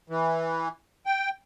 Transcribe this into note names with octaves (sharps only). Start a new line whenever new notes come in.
E3
G5